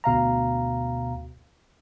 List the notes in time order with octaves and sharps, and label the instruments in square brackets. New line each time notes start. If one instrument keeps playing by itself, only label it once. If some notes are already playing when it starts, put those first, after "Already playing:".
[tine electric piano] D2 B2 F5 A#5